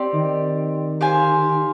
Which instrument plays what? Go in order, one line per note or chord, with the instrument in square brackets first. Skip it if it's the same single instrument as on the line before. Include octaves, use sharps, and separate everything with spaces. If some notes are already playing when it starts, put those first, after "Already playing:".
Already playing: [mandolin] C4 G4 D5
[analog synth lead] D#3
[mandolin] G4 C5 F5 G#5